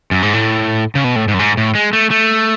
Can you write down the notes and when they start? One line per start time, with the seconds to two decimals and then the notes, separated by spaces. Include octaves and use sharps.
0.11 F#2
0.23 G#2
0.34 A2
0.95 C#3
1.04 B2
1.16 A2
1.28 G#2
1.34 F#2
1.39 G#2
1.57 A2
1.75 G#3
1.93 A3
2.11 A3